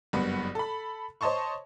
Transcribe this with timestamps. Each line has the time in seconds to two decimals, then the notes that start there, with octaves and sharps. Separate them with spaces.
0.13 F#1 G2 B3 F#5
0.55 A4 B5
1.21 C5 C#5 D#5 A5 C6 C#6